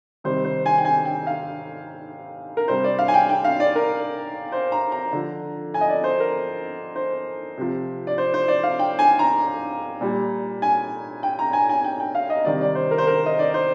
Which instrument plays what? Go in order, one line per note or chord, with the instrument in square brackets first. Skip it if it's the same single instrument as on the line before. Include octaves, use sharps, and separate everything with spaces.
[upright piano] C3 D#3 G3 C5
C5
G#5
G5
G#5
G5
F5
A#4
C3 G3 C5
D5
F5
G#5
G5
G5
F5
D5
A#4
C5
A#5
A#5
D3 F3
G#5
D#5
D5
C5
A#4
C5
C3 F3
D5
C5
C5
D5
F5
G5
G#5
A#5
A#2 G3
G#5
G5
A#5
G#5
G#5
G5
G5
F5
D#5
C3 D#3 G3 D5
D5
C5
A#4
C5
A#4
D#5
D5
C5